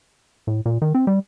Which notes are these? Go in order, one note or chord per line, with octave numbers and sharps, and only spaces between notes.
A2
A#2
D#3
C4
G3